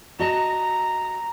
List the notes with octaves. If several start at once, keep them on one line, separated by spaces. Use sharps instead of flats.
F#4 D#5 A5 A#5